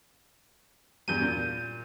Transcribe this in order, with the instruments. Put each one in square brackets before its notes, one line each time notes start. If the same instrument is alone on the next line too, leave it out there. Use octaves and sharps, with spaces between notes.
[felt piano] E2 G2 F#3 [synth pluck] G6 D#7
[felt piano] A#2